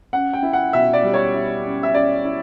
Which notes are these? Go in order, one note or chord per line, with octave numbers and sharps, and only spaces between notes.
C#4 F#5
G5
E4
F#5
B2 E5
D5
G3
C#5
E4
C#4
E5
C#4 D5
E4